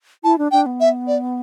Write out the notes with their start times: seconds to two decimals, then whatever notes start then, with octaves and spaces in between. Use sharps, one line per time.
0.24 E4 A5
0.38 D4
0.52 D4 G5
0.66 B3
0.80 E5
1.08 D5